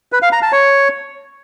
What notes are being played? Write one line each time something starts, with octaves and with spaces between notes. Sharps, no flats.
B4
F5
A#5
A5
C#5